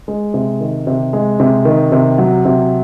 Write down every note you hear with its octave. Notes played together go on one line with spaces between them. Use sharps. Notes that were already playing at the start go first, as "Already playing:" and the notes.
G#3
C3
D#3
C3
G#3
C3
D#3
C3
F#3
C3